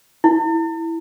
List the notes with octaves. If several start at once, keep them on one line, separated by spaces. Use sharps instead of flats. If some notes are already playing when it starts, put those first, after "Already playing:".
E4